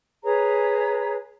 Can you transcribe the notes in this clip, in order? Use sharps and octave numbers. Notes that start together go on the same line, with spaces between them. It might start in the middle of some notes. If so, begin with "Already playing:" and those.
G#4 B4 C#5 A#5